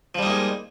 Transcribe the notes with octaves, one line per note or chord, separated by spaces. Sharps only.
F3 G3 G#3 A#3 D#4